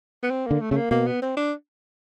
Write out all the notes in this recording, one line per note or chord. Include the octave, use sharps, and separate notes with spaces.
B3
C4
D3 A#3
A3
C#3 A3
A#3
B2 A#3
B3
C4
D4